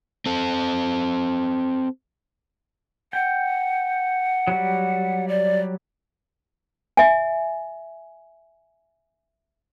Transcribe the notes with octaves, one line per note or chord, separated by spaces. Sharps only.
C4 A4
F#5 G5
F#3 G3
D5
E5 G#5